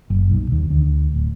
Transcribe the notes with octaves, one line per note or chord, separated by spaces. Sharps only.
F#1
B1
D#2
D2
D1